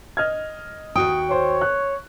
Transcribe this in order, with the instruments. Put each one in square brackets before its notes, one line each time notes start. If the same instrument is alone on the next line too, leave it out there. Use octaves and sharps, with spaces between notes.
[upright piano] D#5 F6 G#6
[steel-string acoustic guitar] D#2 F#4 G5 [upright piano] D#6
[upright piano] C5 [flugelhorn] C#5
[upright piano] F#6